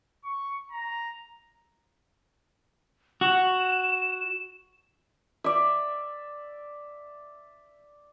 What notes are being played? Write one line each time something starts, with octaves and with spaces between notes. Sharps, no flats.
C#6
A#5
F#4 E7
D5 E5